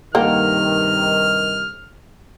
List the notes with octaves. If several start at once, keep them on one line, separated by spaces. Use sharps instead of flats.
G2 C3 D#3 A#3 A4 F#5 G5 F6